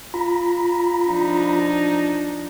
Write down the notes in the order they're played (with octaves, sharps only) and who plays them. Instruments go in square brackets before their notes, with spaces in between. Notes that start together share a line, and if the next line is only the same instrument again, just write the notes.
[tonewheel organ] F4 A#5 B5
[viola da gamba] F3 D4 D#4